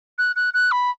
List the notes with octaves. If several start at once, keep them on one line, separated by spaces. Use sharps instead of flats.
F#6
F#6
F#6
B5